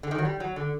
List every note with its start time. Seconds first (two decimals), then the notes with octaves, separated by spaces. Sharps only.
0.03 D3
0.11 D#3
0.18 F#3
0.25 G3
0.40 F#3
0.56 D3